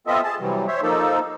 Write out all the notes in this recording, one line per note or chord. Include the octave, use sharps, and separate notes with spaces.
B3 C4 F4 A4 D#5 E5
G#4 A5
C3 E3 F#3 G3
C5 C#5 E5
F3 A#3 D#4 A4